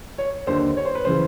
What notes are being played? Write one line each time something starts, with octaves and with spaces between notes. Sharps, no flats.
C#5
D#2 D3 C5
C#5
C5
B4
C#3 E3 C5